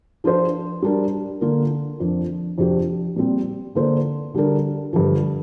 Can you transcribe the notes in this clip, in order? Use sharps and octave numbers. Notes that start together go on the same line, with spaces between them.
F3 D4 F4 C5
G3 D4 A#4
D3 A#3 F4 A#4
F2 F3 D4
F2 C3 F3 D4 G4
A#2 G3 C4
D3 A#3 F4 C5
D3 G3 D4 A#4
G2 D3 F3